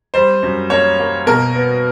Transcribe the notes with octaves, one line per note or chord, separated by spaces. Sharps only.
G3 C5
F#2
A#3 C#5
A#3
B2 A#4
B3